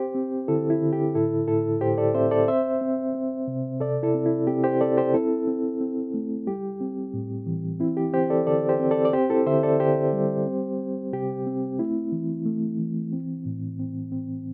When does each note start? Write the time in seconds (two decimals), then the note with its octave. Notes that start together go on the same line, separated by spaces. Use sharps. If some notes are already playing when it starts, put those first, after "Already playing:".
Already playing: C4 G4 C5
0.15 C4
0.48 D3 E4 A4
0.70 E4
0.82 D3
0.93 G4
1.15 A2 E4 A4
1.48 A2 E4 A4
1.81 A2 G4 C5
1.98 A4 D5
2.14 C4 C5 E5
2.31 A4 D5
2.48 C4 C5 E5
2.81 C4
3.15 C4
3.48 C3
3.81 C3 A4 D5
4.03 E4 A4
4.15 C4
4.26 E4
4.47 C4 G4
4.64 G4 C5
4.81 C4 A4 D5
4.97 G4 C5
5.14 C4 E4 A4
5.48 C4
5.81 C4
6.14 A3
6.47 G3 G4
6.81 C4
7.14 A2
7.47 E3
7.80 C4 E4
7.97 G4
8.14 C4 G4 C5
8.30 A4 D5
8.47 D3 A4 D5
8.69 G4 C5
8.80 C4
8.91 A4 D5
9.05 D5
9.13 C4 G4 C5
9.30 E4 A4
9.46 D3 C5 E5
9.63 A4 D5
9.80 D3 G4 C5
10.13 G3
10.46 C4
10.79 C4
11.13 C3 G4
11.47 C4
11.79 A3 E4
12.12 E3
12.45 A3
12.79 E3
13.12 C4
13.46 A2
13.79 C4
14.12 C4